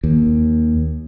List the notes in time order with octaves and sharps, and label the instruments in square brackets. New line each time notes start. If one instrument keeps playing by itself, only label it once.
[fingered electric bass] D#2